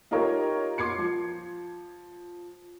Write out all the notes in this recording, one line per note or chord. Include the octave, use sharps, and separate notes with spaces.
D#4 F4 G4 A#4 C#5
C6 D6 G#6 C7 C#7
F3